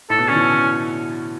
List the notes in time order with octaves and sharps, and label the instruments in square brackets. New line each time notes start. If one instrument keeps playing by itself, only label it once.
[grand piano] A2 [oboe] A4
[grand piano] B2
[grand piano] D3 [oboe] C#4
[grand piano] E3